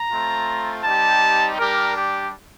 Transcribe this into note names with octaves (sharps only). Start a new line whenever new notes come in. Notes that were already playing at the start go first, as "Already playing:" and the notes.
Already playing: A#5
A3 C4 F4
G3 C4 D#4 G4 A5
G3 D4 G4 A#4
G4